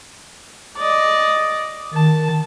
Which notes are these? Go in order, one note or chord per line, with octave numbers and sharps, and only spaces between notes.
D5 D#5
D#3 A5